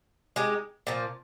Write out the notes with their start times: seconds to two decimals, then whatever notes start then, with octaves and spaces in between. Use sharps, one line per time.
0.36 G#3 D#4 G4
0.87 A#2 F3 A#3